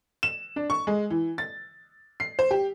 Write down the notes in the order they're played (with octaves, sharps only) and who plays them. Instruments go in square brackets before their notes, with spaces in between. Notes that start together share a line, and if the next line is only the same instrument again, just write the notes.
[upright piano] E7
D4
C#6
G#3
E3
A6
C7
C5
G4